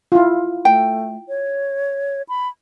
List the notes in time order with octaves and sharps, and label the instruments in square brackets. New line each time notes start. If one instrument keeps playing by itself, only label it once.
[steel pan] E4 F4
[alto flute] A3 [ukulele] G5
[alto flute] C#5
B5